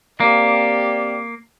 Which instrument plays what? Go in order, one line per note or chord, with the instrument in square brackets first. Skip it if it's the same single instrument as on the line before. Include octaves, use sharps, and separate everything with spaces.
[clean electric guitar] A#3 [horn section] C4 G4 D5